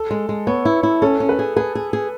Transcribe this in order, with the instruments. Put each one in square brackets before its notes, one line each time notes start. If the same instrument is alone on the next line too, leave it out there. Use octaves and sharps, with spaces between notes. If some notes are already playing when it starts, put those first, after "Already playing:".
Already playing: [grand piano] A4
[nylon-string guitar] G#3
G#3
[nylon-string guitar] B3 [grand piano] C#5
[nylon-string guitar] E4
E4
[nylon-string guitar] C#4 [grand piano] A4
[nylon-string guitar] C#4
[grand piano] B4
[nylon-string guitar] G#4
[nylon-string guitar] G#4 [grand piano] B4
[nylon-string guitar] G#4
G#4